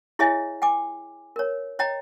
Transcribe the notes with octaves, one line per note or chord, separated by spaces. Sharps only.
E4 G#4 C#5 D#5 E5 G#5
G5 G#5 D6
A#4 C#5
C#5 D#5 G5 A#5